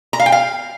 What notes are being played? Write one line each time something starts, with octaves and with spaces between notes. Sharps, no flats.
A#5
F5
G5
F5